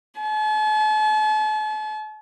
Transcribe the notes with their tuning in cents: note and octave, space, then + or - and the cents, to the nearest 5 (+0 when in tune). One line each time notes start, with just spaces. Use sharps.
A5 -45